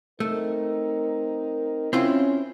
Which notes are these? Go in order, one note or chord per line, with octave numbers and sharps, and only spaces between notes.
A3 C4 D#4 A#4
C4 C#4 E4 F4